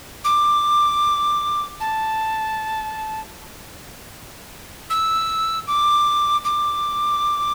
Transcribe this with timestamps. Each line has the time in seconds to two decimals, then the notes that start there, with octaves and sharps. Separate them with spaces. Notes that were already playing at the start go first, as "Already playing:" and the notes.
0.24 D6
1.80 A5
4.90 E6
5.67 D6
6.45 D6